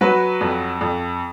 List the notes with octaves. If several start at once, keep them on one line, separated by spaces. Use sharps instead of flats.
F#3 B4
F2
F2